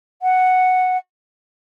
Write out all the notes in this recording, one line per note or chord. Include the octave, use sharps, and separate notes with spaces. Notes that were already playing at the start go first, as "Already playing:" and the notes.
F#5